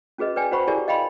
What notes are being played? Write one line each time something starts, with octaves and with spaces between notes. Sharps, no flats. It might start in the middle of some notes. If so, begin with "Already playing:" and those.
C#4 F#4 G#4 B4 D#5
B4 D5 G5 G#5
F#4 B4 C5 F#5 B5 C#6
E4 G4 G#4 A#4 D5 G#5
D#5 F5 G5 B5 C6